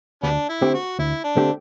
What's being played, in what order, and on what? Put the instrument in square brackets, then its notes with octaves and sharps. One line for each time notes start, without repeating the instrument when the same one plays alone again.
[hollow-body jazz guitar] D2 [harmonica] G3 B3 D4
[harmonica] E4
[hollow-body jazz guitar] D3 A3 C4 G4
[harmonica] F#4
[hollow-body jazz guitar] D2 [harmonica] E4
[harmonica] D4
[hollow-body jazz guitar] D3 A3 C4 G4